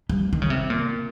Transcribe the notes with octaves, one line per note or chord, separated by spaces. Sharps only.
G3
D#3
C#3
C3
A#2